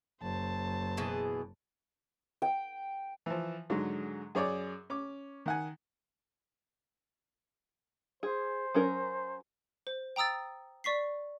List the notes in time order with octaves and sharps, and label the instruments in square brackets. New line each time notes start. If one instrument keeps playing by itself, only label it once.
[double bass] F#1 [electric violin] C5 A5
[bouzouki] B2 E3 G#4
[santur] G5
[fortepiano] E3 F3
G#2 D3 F#3 G#3
F#2 G#4 C#5 D5 D6
C#4 D6
D#3 F#5 G#5
[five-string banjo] G#4 [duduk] C5
[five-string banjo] F#3 C#4 A#4
[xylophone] C5
G5 A#5 D#6 E6 A6
D5 C#6 B6 C7